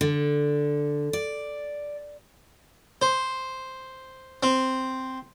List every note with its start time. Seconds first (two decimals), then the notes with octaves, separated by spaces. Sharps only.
0.01 D3
1.13 D5
3.02 C5
4.43 C4